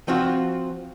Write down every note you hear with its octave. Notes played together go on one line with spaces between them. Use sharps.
F3 C4 F4 F#4